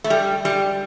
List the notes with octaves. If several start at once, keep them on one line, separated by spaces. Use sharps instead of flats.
A3
G3
G3